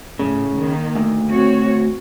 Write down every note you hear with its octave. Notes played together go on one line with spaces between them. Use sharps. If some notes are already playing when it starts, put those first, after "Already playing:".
A2 C#3
D#3 A#3
D2
C4 F#4 C#5